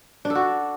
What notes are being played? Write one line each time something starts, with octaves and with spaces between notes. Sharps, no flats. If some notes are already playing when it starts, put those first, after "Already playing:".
D4
A4
F#4